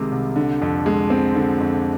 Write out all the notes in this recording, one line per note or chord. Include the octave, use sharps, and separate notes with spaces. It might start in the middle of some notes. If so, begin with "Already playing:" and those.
Already playing: C2 C3 D#3 G#3
C2
D3
F2
G#3
C4
D3
F2